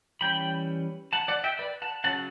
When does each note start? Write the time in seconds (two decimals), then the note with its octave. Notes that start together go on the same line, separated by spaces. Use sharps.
0.21 E3 G3 C#4 G5 B5
1.13 F#5 A5
1.28 D5 F#5
1.44 E5 G5
1.59 B4 D5
1.82 F#5 A5
2.04 C#3 F#3 C#4 F#5 A5